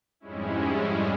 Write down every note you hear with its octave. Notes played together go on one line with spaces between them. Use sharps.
F2 G#2 G3 G#3 C#4 E4